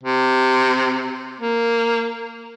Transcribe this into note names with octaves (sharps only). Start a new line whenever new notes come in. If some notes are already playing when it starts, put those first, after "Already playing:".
C3
A#3